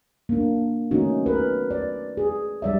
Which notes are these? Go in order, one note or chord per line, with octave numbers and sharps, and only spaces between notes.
A#3 D4
D#3 A3 C#4 D#4 F#4
A#4 B4
D5
G#4
G3 D5 E5